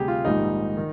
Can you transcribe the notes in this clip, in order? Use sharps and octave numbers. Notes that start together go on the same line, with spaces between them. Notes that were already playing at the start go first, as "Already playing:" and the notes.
Already playing: D2 C3 G3 G4 G#4
F4
A#1 G#2 D#3 G3 D#4
D#3